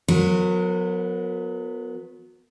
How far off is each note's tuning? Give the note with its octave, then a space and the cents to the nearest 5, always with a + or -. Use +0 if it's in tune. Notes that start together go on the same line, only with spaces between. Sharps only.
F#3 -35 B3 +0 A#4 -30